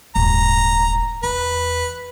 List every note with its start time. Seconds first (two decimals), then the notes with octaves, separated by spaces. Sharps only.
0.15 D#1 G#1 A#5
1.24 E2 B4